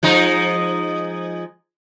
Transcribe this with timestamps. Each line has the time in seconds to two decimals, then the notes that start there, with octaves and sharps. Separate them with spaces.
0.03 F3 G#3 D#4